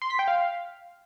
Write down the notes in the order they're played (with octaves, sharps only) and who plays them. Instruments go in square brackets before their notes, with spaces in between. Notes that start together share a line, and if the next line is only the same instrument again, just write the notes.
[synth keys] C6
B6
G5
F5